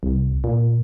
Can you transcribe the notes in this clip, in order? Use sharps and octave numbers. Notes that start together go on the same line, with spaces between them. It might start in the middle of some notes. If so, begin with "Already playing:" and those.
C2
A#2